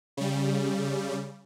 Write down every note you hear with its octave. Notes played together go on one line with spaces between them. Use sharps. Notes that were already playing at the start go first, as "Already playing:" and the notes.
C#3 G3